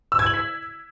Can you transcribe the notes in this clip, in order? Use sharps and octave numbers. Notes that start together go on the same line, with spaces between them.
E6
G#6
F#7
B6